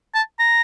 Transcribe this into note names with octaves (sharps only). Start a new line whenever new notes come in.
A5
A#5